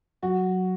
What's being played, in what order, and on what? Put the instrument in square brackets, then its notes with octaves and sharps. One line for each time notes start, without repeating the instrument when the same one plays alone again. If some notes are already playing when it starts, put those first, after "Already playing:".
[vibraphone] F#3 [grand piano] F#4